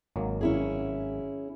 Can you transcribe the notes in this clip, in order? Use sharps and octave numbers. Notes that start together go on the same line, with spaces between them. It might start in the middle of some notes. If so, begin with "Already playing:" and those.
G#1 F#3 A#3
C#4 E4 G#4